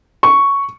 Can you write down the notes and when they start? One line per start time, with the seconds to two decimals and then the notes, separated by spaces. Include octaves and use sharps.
0.23 C#6